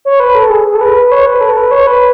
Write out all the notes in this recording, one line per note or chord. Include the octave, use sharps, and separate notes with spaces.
C#5
B4
A4
G#4
G#4
A4
B4
B4
C#5
B4
A4
B4
C#5
B4